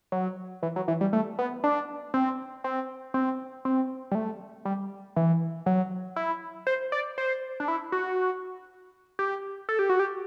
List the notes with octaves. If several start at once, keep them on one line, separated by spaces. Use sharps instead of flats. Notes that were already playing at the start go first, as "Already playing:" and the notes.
F#3
E3
F#3
E3
G3
A3
B3
D4
C4
C4
C4
C4
G3
A3
G3
E3
F#3
E4
C5
D5
C5
D4
E4
F#4
G4
A4
G4
F#4
G4